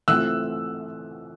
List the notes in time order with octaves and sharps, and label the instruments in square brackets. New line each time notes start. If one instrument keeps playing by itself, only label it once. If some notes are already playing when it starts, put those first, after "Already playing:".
[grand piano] E3 A3 C4 F4 [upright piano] E6 F#6